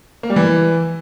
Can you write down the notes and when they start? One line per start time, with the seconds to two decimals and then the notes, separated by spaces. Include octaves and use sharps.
0.23 A#3
0.30 G3
0.36 E3